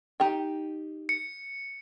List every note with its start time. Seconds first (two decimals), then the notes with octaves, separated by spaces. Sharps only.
0.20 D#4 G4 G5
1.09 C#7